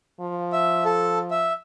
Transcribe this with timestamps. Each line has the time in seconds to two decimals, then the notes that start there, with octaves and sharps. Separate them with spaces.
0.21 F3
0.53 E5
0.85 A4
1.31 E5